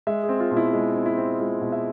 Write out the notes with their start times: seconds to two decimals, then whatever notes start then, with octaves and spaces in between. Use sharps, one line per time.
0.07 G#3 E5
0.23 G#4
0.29 C4
0.40 F4
0.51 B2
0.57 E4
0.73 G#3
0.95 C4
1.06 E4
1.18 C4
1.40 G#3 F4
1.61 B2
1.72 E5